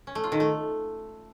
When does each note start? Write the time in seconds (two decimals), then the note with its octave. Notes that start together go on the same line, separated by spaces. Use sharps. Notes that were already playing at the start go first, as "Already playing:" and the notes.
0.07 C#4
0.15 A3
0.24 F4
0.32 D#3
0.40 A3